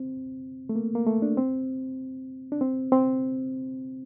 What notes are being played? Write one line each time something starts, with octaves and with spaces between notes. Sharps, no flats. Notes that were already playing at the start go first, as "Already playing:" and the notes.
Already playing: C4
A3
A#3
A#3
A3
D4
C4
D4
C4
C4